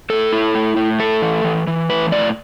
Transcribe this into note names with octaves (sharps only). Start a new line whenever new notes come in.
A2 A4
E4
A2
A2
A3 A4
E3
E3
E3
A2 B4
A2 D5